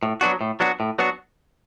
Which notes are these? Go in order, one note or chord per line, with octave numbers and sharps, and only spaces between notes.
A2
F#3 B3 D4 F#4
A2
F#3 B3 D4 F#4
A2
F#3 B3 D4 F#4